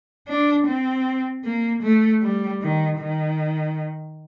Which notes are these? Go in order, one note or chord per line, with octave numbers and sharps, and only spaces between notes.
D4
C4
A#3
A3
G3
D#3
D#3